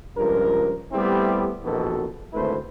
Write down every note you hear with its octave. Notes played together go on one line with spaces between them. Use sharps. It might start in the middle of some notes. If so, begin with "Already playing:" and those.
C#2 G2 F3 A#4
G3 A3 B3 C4 E4 G4
A#1 E2 B2 D#3 F#4 A4
G#1 D2 A3 E4 B4 C5